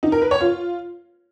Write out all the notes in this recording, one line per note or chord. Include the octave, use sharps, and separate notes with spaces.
D#4
A#4
B4
C#5
F4